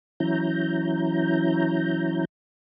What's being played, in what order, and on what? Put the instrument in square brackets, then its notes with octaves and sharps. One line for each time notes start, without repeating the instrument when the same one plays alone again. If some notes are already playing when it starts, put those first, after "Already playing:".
[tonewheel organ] E3 F#3 C#4 E4 A#5 G6